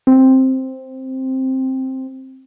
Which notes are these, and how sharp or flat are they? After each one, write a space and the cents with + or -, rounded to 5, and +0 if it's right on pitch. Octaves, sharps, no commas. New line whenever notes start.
C4 +5